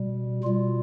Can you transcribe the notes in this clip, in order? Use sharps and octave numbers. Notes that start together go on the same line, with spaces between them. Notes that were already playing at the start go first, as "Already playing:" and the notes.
Already playing: B2 G3
B2 G3 F4